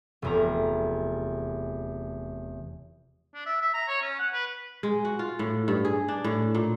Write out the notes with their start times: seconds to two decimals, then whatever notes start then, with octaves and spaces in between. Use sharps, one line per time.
0.22 F1 E2 A#5
3.34 D4
3.46 E5
3.62 E5
3.74 A#5
3.88 C#5
4.02 C#4
4.19 F#5
4.33 B4
4.83 G#3
5.05 F#4
5.19 F4
5.39 A2
5.68 G2
5.85 G#4
6.08 D4
6.24 A2
6.55 A#2